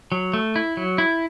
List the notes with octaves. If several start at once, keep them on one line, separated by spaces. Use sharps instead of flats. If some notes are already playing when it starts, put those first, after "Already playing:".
F#3
A3
E4
F#3
E4